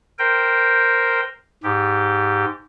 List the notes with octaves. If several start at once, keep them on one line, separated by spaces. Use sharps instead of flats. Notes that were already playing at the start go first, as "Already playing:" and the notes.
A#4 C5 G5
G#2 G4